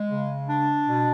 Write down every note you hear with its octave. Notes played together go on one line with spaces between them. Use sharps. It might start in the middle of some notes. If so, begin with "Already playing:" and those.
Already playing: G#3
C#3
D4
B2